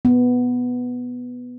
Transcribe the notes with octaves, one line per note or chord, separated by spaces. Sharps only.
B3